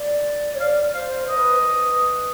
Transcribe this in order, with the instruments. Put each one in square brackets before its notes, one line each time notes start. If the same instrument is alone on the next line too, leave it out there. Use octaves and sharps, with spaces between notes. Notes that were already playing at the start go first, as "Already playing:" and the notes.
Already playing: [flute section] D5
C#5
[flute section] D5 [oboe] F5
[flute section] C5 [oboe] F5
[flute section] B4 [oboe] D#5
[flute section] B4